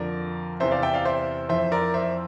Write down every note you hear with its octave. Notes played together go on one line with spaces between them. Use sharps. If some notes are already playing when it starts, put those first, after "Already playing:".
Already playing: F2 D3 F3 A#4 D5
E2 C3 E3 C5 E5
D5 F5
E5 G5
D5 F5
C5 E5
F2 E3 C5 E5
A#4 D5
C5 E5